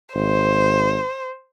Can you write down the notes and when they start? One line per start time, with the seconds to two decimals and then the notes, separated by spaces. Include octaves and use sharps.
0.15 G#1 C5